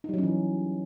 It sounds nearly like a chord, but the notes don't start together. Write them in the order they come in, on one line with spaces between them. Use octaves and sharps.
D#4 G3 F#3 C#4 E3